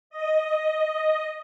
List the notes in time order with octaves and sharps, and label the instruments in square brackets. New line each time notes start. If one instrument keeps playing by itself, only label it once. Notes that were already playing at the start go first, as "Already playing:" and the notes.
[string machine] D#5